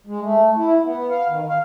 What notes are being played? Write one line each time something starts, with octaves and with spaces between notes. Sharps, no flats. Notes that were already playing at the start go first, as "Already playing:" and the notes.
G#3
A3
E4
B3
F5
D#3
F5